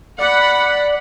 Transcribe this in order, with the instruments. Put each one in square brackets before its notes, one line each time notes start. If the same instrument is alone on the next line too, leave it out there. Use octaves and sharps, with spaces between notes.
[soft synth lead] D5 [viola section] F#5 B5